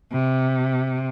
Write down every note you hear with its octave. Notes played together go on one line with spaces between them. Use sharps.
C3